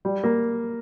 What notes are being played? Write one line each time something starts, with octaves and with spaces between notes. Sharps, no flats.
G3
A#3